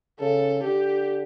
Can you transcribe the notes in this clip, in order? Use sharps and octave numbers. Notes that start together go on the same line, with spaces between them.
C#3 A4
D3 G4